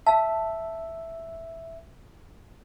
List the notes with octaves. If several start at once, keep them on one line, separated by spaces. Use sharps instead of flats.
E5 F5 A5